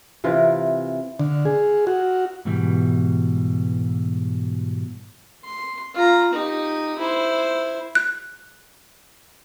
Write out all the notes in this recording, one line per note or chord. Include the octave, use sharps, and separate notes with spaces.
C3 E3 F4 A#4
D3
G#4
F#4
G#2 B2 E3 G3
C6
F4 A#5
D#4 G4
E4 C5
F#6